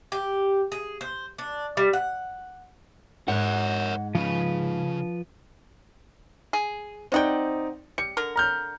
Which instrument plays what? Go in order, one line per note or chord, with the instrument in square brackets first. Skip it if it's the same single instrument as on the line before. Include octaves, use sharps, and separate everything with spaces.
[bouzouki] G4
G#4
C5
D4
G3
F#5
[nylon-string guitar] G#2 G#3 [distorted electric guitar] A#4 C#5 [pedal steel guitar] F#5 F#6
[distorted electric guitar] C#3 [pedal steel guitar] F3 B4
[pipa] G#4
[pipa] C3 F#5 G5 [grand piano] C4 D#4 D5
[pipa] G3 [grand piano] C#7
[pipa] D3 A#4
[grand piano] A#5 F6 G6